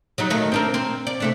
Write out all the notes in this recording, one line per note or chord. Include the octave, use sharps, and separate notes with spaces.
F#3 G3 D#4
D#3 F#3 A3
C4 D4 A#4
C4
D5
C3 A3 D4